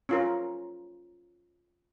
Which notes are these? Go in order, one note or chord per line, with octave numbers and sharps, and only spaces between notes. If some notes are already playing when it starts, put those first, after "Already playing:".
C#4 F4 A#4